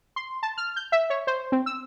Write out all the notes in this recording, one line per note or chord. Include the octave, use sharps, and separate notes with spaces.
C6
A5
F6
G6
E5
C#5
C5
C4
E6